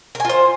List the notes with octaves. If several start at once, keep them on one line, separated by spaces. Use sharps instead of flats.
F4 A#4 C5 G#5